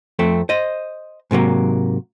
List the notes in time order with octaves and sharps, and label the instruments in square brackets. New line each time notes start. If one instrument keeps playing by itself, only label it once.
[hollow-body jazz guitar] F2 A3 C4
C5 D#5
G#2 C3 F#3 A#3